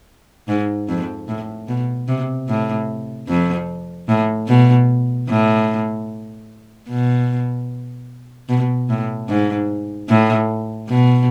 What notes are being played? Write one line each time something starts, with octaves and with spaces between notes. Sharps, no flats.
G#2
F2
A2
B2
C3
A2
F2
A2
B2
A2
B2
B2
A2
G#2
A2
B2